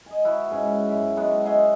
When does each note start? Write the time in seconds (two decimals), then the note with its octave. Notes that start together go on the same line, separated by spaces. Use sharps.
0.06 D#5 G#5
0.25 E4 F#4 B4
0.51 G#2 C#4 G#5
0.89 F#2 E5
1.17 F#3 G#3 B3 F#4
1.45 D#5 E5 G#5 C6